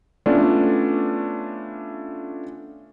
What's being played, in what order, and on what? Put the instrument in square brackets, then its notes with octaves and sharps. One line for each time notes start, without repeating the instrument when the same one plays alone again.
[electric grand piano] A3 B3 C#4 D4 F4 D5